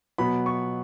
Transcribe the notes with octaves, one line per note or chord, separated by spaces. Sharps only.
B2 F#3 B3 B5
C#6